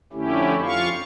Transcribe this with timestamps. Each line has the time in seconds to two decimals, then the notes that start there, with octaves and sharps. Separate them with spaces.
0.13 F2 D3 A3 C#4 E4 G4
0.64 F2 F4 F5 C#6